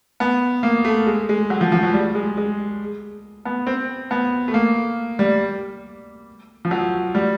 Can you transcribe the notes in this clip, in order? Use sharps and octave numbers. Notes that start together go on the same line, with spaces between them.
B3
A#3
A3
G#3
G#3
F#3
F3
F3
F#3
G3
G#3
G#3
B3
C4
B3
A3
A#3
G3
F3
F#3
G3